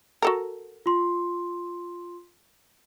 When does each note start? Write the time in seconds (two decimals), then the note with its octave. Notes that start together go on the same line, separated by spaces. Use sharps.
0.22 F#4 A4 A#4
0.86 F4 C6